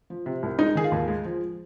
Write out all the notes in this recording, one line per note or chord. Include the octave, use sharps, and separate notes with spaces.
F3
C3
C2
G#3 D#4
D#3 G#4
F4
D#2
G#3
F3